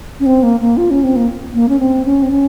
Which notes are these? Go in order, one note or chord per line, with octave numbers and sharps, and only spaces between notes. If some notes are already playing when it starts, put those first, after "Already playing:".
C#4
C4
A#3
A#3
F4
C#4
C4
A#3
A#3
C#4
C4
C#4
C4
C#4